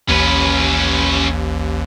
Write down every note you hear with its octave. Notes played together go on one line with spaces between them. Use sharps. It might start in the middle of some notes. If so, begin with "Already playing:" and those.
A1 D#2 C#4 B4